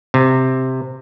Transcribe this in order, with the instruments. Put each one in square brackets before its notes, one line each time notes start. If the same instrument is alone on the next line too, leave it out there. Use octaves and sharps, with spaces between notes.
[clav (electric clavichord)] C3